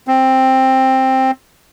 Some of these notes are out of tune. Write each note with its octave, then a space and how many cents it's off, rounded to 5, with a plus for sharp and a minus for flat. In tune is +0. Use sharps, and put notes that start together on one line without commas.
C4 +10